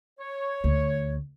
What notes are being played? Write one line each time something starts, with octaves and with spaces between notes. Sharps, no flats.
C#5
D2